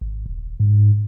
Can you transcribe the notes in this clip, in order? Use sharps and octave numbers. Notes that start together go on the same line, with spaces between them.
G#1
D#1
G#2